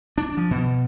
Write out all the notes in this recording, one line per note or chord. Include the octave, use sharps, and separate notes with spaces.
D4
F3
B2